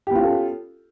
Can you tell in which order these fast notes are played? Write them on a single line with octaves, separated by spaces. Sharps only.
G4 B3 F4 C#4 A4